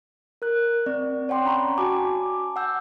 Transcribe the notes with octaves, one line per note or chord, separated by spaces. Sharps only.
A#4 F#6
C4 D5
C#5 F#5 G5 C6 D6
C#4 A#5 B5 C#6
F#4 G#5 A5 D6
F#5 E6 G6